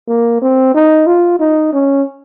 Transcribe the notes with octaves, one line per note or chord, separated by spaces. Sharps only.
A#3
C4
D#4
F4
D#4
C#4